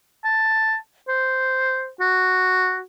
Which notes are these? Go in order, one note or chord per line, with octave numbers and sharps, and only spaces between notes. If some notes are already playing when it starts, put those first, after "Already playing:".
A5
C5
F#4